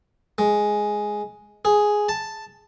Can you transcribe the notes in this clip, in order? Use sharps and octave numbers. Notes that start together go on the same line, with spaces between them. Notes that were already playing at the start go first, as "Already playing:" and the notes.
G#3
G#4
A5